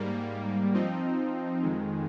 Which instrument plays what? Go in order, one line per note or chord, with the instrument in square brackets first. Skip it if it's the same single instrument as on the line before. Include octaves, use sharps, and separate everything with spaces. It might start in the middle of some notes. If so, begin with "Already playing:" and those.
Already playing: [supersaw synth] G#2 G3 A#3
F3 C4 D#4
F2 D#3 G#3